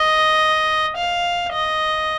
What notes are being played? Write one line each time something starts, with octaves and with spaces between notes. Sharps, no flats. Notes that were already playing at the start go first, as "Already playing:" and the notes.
Already playing: D#5
F5
D#5